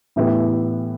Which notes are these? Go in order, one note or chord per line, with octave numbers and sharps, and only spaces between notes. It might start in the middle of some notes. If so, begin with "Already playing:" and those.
A2 E3 B3 E4 G4